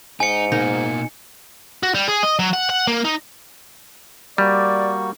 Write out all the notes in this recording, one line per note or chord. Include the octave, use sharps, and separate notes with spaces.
G#2 D#4 G#5 C#7
B2 A#3 D#4 A#4
F#4
G3
G#4
D#5
F#3
F#5
F#5
A#3
D#4
G3 A#3 F#4 D5